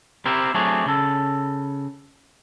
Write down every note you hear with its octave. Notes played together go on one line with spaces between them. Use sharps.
C4 E4 G4 A#4 C5
F#3 A3 C4 D4 G#4 C#5
C#3 A4